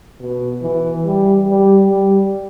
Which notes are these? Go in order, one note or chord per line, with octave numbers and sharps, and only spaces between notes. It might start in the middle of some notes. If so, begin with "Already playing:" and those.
B2
E3
G3
G3
G3